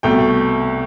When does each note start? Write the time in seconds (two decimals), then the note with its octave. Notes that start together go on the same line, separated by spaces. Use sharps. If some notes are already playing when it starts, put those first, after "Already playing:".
0.03 C2 B2 A3 G5